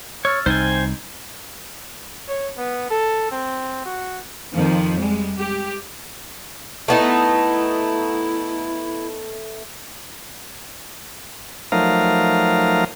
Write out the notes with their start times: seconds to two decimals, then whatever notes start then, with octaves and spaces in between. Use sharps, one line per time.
0.25 C#5 E6 F6 A6
0.46 C2 D#4 C5 G5 G#5
2.28 C#5
2.57 B3
2.90 A4
3.31 C4
3.85 F#4
4.53 F2 D#3 F3
4.99 G3 G#3
5.36 G4
6.88 A3 B3 D#4 E4
11.72 F3 F#3 A3 D#4 A#4 F5